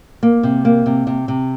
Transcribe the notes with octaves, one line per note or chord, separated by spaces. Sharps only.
A#3
C3
A#3
C3
C3
C3